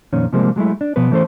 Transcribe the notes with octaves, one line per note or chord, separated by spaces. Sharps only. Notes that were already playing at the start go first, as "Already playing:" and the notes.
F2 A#2 D#3 C#4
C3 F3 G3 G#3 A#3 C4
F#3 G#3 A3 E4
D4
B2 F3 B3 B4
E3 A3 C#4 A4 C5